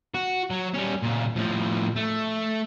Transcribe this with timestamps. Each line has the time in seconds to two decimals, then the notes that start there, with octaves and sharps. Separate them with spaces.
0.14 F#4
0.50 F#3
0.74 G3 C#4
1.03 A#2 C#3
1.36 A2 F3
1.96 A3